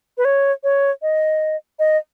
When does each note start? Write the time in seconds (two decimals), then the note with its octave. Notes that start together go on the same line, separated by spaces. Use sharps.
0.18 B4
0.25 C#5
0.64 C#5
1.02 D#5
1.79 D#5